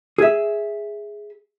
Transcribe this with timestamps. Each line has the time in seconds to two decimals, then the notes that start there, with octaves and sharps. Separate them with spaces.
0.18 G#4 E5